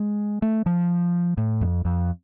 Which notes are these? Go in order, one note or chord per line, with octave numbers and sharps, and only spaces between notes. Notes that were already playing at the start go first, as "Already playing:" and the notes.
Already playing: G#3
A3
F3
A2
F2
F2